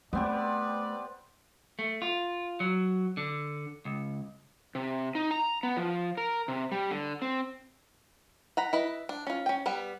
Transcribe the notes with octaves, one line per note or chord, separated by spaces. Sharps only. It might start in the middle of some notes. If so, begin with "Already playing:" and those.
A3 B3 C4 G4 B4 D5
A3
F4
F#3
D3
C#2
C3
D#4
A#5
B3
F3
A#4
C3
G3
D3
C4
F#5 A#5 B5
E4 B4 D#5
D4
C#4 F4
C#4 G5
G3 B3 F#5